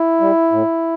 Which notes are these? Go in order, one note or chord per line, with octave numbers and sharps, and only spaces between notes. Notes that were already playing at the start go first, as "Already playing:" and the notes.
Already playing: E4
G3
A2